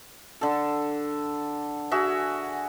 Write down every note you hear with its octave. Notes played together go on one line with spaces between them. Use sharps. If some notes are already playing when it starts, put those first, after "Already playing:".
D3 A4
F#4 G#4 E5